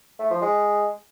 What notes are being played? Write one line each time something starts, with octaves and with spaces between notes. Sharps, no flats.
A3
F3
G#3